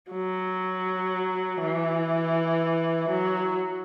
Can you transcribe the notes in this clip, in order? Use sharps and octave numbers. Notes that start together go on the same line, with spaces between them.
F#3
E3
F#3